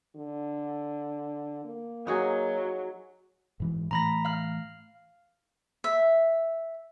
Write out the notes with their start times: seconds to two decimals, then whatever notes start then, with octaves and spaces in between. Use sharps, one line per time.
0.16 D3
1.65 A#3
2.07 F#3 D#4 F#4 G#4
3.60 G#2 E3 G#3
3.91 A2 E3 A3 A#5 B5 A#6
4.25 F5 F6
5.84 E5